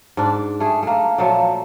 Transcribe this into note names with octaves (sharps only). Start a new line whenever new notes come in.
G#2 D4
A3 G#4
A3 A#3
A#2 F3 F#3 A3